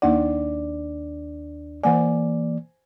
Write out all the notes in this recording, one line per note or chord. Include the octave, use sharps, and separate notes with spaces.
D#2 A#3 D4 D#4 D5 F#5
E3 A#3 C5 D5 F#5 G#5